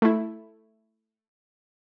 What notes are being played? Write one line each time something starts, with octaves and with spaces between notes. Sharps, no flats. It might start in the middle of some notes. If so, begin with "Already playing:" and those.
A3 E4